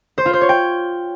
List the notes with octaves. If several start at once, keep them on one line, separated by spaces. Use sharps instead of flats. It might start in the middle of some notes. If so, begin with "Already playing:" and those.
C5
F4
C5
C#5
G5